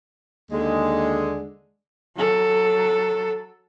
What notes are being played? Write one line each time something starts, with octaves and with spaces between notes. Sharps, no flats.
D#2 D3 G#3
F#3 A4